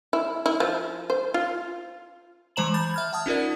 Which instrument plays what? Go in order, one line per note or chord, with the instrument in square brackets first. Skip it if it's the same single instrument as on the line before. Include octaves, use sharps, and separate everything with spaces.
[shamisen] E4
E4
F3
C5
F4
[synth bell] E3 G#3 C5 A#5 E7 F#7
B5 G6 A6
E5 F6 G#6
F#5 A5 D#6
C#4 D#4 F4 A#4 D5